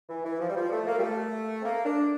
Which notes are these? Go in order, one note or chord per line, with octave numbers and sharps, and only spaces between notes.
E3
E3
F3
G3
F3
A3
A#3
G3
A3
C4
A#3
D4